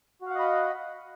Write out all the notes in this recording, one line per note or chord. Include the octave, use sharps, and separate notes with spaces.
F#4 D#5 F5 F#5 B5